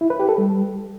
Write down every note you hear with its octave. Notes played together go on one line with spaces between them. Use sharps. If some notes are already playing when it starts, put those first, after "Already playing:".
E4
B4
G4
A4
G3